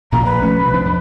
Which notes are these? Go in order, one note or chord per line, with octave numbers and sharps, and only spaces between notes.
A#1 A#2 A#3 A#5
B4
F3 A3 C#4
C2 B2
F3 C4 D4
F2